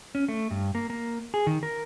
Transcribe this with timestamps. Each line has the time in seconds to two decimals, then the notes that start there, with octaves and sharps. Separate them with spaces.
0.15 C#4
0.28 A3
0.51 G2
0.75 A#3
0.90 A#3
1.34 G#4
1.47 D#3
1.63 A#4